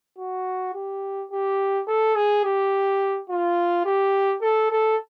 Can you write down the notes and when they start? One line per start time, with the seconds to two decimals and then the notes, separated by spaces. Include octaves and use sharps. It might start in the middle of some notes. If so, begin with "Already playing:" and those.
0.19 F#4
0.75 G4
1.31 G4
1.88 A4
2.16 G#4
2.45 G4
3.30 F4
3.85 G4
4.42 A4
4.71 A4